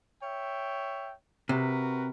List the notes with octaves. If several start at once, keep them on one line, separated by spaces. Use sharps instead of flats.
C#5 E5 G5
C3 F#4 A#4 B4